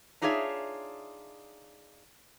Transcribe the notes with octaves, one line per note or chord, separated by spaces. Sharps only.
D4 D#4 F4 G#4 C#5 E5